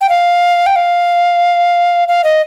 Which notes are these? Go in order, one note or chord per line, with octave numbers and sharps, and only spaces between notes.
G5
F5
G5
F5
F5
D#5